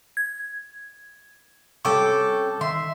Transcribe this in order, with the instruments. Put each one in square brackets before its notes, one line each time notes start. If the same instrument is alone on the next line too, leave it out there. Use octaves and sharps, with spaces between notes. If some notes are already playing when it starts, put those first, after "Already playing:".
[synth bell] G#6
[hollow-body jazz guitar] C3 G3 B5 [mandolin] C#4 A4 G5 [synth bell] C#6 D6
[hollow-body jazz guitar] D#3 D#5 [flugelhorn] E5 [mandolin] C6